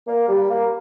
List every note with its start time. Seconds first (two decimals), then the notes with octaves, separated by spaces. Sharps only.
0.07 A#3
0.28 G3
0.50 A#3